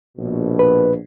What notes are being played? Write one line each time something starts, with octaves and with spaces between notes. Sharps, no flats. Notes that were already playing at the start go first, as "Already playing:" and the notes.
A#1 B2
B4